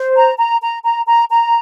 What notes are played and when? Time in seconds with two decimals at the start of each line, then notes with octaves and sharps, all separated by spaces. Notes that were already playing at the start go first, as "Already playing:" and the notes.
Already playing: C5
0.15 A#5
0.38 A#5
0.61 A#5
0.83 A#5
1.05 A#5
1.28 A#5